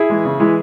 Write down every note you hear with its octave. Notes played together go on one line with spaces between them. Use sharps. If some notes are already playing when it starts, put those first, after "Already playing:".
Already playing: E4 G#4
E3 G#3
C#3
E3 G#3